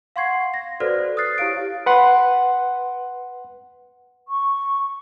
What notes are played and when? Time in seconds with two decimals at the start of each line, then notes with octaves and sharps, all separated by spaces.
0.16 F5 F#5 C6 C#6 G#6 C7
0.54 A#6
0.80 F#4 A4 B4 C5 D5 F6
1.17 D#6 F6 F#6 A6 C7
1.38 E4 G4 C#5 F5 D7
1.86 B4 F#5 C6
4.28 C#6